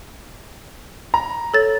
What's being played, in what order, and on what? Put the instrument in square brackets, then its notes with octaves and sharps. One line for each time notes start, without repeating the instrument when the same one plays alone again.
[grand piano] A#5
[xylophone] A4 C#5 A6